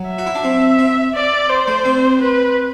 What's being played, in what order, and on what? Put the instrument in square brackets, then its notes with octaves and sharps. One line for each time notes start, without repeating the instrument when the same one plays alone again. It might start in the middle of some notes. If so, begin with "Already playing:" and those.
Already playing: [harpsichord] F#3
[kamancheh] E5
[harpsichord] F#4
E4
D4
C4
C4
[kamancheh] D5
C5
[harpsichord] A3
C4
[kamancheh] B4